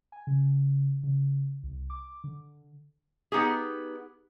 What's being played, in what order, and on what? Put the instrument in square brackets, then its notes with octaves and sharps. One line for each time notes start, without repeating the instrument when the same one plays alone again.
[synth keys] G#5
C#3
C#3
C2
D6
D3
[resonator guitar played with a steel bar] B3 D#4 G4 G#4